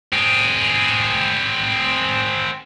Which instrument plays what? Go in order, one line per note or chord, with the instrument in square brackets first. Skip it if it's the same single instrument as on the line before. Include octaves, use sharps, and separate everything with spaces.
[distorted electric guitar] C4 G#4